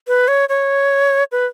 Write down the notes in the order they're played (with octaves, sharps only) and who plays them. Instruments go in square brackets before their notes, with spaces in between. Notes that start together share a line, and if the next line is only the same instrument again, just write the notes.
[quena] B4
C#5
C#5
B4